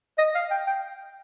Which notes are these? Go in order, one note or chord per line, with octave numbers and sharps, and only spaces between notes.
D#5
F5
G5
G5